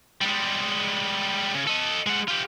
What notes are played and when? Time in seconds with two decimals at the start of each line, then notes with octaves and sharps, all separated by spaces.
0.21 G3 G#3
1.55 C#3
1.67 A4 D#5
2.07 G#3 F#5
2.28 F4 G4